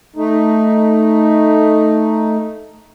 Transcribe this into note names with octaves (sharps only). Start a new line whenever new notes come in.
A3 D#4